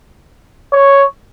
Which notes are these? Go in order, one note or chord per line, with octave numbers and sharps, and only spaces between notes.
C#5